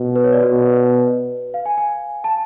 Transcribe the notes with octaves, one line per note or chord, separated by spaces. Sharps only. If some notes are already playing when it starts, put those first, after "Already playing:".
Already playing: B2
B4
C#5
D5
F#4
B2
B4
F5
G#5
G#5
A5